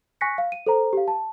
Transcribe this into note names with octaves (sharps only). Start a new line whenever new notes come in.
G#5 C#6 F#6 A#6 B6 C#7
F5
D#7
A4 C5 A#5
G4 F5
A5